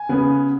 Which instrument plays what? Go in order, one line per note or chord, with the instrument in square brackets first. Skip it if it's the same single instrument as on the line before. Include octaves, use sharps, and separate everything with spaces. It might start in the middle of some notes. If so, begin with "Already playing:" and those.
Already playing: [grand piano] G#5
C#3 B3